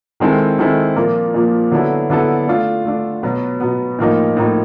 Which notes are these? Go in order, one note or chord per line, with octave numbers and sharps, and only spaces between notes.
D#3 G#3 C4 E4 A4
D#3 G#3 C4 E4 A4
A#2 F3 A#3
A#2 F3 A#3
D3 F#3 B3 E4 A4
D3 F#3 B3 E4 A4
A3 D4 F4
A3 D4 F4
B2 F#3 B3
B2 F#3 B3
A2 F3 A#3 D#4
A2 F3 A#3 D#4